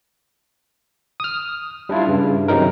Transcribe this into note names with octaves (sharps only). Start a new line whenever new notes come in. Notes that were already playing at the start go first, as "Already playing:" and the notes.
D#6 F6
G3 D4 E4 F4
G2 C#3
C3 D#3 F#3 D#4 A#4